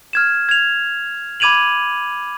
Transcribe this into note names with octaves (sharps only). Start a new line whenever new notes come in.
F6 G#6 E7
G#6 F7
B5 D6 G#6 D#7 F7 F#7